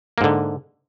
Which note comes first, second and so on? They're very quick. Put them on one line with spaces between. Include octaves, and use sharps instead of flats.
A#3 G#2 D3